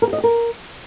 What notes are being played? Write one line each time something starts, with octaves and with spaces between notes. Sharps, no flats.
A#4
G4
D#5
G4
A#4